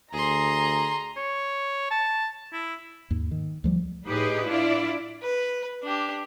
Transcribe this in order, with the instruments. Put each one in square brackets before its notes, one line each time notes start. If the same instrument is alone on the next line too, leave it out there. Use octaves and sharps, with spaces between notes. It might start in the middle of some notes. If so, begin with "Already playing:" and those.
[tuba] D2 [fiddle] G#4 C6 [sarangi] A#5
[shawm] C#5
A5
E4
[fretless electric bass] D#2 G#2
D#3
D2 F3 G3
[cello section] A2 D#4 G4 G#4 B4 D#5
D4 E4 F4 D5
[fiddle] B4
D4 G4